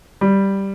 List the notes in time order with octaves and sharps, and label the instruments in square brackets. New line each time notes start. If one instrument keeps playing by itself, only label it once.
[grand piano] G3